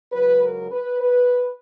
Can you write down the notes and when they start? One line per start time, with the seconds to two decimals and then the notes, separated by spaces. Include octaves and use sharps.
0.12 C#2 C#3 F#3 B4
0.41 A#4
0.71 B4
1.00 B4